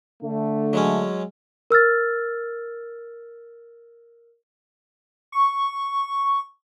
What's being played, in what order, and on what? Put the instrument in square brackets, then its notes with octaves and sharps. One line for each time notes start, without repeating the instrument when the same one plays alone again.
[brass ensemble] D3 A3
[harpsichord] F#3 G#3 C#4
[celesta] A#4 E6 F6 A6
[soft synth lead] C#6